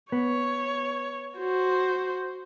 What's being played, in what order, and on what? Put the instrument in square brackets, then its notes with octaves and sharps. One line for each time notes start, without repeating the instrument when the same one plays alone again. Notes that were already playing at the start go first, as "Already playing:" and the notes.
[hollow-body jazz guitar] B3 [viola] C#5
[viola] F#4 C5